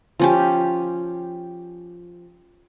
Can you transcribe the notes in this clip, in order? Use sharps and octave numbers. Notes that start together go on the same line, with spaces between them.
F3 C#4 G4